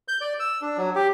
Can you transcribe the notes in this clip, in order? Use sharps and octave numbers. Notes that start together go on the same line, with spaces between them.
G6
D5
E6
D4
F#3
G4